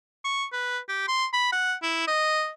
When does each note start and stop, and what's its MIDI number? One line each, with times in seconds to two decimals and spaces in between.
0.25 0.45 85
0.52 0.79 71
0.89 1.04 67
1.08 1.26 84
1.33 1.53 83
1.53 1.74 78
1.83 2.04 64
2.07 2.49 75